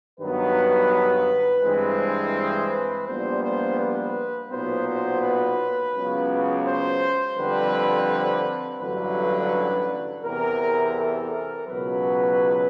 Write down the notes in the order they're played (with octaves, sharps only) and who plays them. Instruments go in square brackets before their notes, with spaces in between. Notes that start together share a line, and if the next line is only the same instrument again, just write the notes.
[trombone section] G2 D#3 F#3 B3 B4
G2 E3 G#3 C4
C5
B4
A#1 A#2 G3 B3 C5
C5
B4
B1 A#2 F#3 B3 C5
C5
B4
C#2 C#3 F#3 B3
C5
F2 D3 G3 C4 B4
A1 G2 D3 F#3 B4
E2 C3 E3 A#4
A4
A#4
C#2 B2 F#3 B4